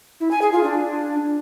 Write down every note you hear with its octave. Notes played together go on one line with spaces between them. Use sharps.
E4
G#5
G#4
F4
D4